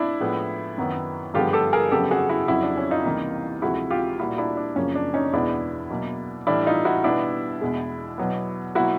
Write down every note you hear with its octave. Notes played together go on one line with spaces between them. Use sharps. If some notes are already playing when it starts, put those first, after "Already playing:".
Already playing: D4 E4
A2 F3 G#3 B3
F#2 D#3 F#3 B3
G2 D3 F3 G#3 B3 F4 G4
G4 A4
G#4 A#4
F2 C#3 F#3 B3 G4 A4
F#4 G#4
E4 F#4
F2 C#3 F#3 E4 F#4
D4
C#4
D#4 F4
C#2 C3 E3 G3 A#3
D2 C3 F3 G#3 E4 F#4
F4 G4
A#2 G3 A#3 E4 F#4
D4 E4
D4
F#2 C#3 F3 A#3 C#4
D4
C#4 D#4
E2 B2 G#3 B3 D4 E4
B2 F#3 A#3
A2 E3 G3 D4 E4
D#4 F4
E4 F#4
B2 G3 B3 D4 E4
E2 B2 G#3
B2 F#3 B3
B2 F#3 A#3 E4 F#4